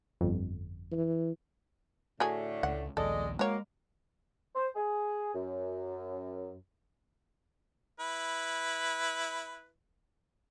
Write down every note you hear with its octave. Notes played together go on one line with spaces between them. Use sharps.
G1 F2
E3
A2 D3 A3 F#4 G#4 A4
C#2 F#5
A#1 D#2 G#3 A4 D5 D#5
G#3 A#3 F#4 C#5
C5
G#4
F#2
E4 B4